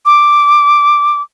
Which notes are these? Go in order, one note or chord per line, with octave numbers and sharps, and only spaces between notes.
D6